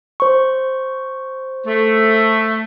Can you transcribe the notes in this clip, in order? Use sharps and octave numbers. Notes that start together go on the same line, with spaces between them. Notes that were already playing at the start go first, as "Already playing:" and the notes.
C5 C#6
A3